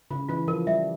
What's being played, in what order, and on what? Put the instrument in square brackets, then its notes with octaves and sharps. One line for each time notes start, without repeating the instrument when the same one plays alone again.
[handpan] C#3 [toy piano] F4
[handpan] E3 [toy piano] F4
[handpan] F3 [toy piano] A#4
[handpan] G3 [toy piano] E5